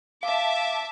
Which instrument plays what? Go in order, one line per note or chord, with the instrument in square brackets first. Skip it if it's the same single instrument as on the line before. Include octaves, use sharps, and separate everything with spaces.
[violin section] E5 A5 D6 [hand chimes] F5